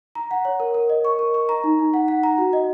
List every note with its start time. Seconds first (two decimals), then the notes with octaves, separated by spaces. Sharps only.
0.15 A#5
0.31 F#5
0.45 C#5
0.60 A#4
0.74 A#4
0.89 D#5
1.05 C#6
1.19 A#4
1.34 C#6
1.49 A#5
1.64 D#4
1.79 D#4
1.94 F#5
2.08 F#5
2.23 A#5
2.38 F#4
2.53 D#5